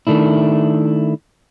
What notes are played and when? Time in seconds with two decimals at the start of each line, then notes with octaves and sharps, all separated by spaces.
0.07 D#3 A3 D4 E4